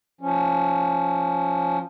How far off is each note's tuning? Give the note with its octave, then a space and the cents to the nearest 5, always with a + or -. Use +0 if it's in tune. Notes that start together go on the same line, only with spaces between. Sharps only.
F3 +5 C#4 +0